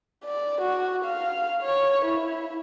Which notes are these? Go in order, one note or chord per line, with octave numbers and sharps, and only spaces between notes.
D5
F#4
F5
C#5
E4